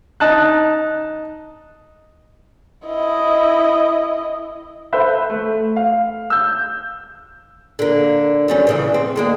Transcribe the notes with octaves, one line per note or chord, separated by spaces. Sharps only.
D#4 A5 F#6
E4 D#5
A4 B4 C5 E5
A3
F5
E6 G6
D3 A#3
F#3 G3 C#4
F2 C#3 E3
C4
D3 G#3 A#3